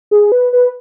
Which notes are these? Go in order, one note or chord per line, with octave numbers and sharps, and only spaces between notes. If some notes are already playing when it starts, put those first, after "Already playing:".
G#4
B4
B4